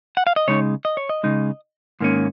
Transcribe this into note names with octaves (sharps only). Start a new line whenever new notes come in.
F#5
F5
D#5
C#3 G#3 D#4 C#5
D#5
C#5
D#5
C#3 G#3 D#4
G#2 D#3 A#3 C#4